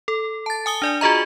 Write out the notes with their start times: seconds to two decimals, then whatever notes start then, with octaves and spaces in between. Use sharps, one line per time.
0.08 A4
0.46 A5 A6
0.66 G#5 D#6 G7
0.82 D4 D5 G#5
1.01 F4 F#4 G#4 D#5 A#5